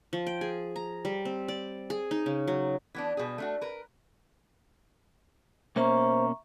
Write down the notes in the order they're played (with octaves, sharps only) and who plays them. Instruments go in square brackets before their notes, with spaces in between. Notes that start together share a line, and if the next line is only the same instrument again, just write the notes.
[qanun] F3
G5
G#4
A#5
G3
C4
D5
G#4
D#4
C#3
F#3
[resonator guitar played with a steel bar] E3 B3 D4
B2 G3 G#4
A3 D4 F#4
A#4 B4
[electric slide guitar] B2 A#3 C#4 [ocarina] C5 [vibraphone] E5 A#5 C#6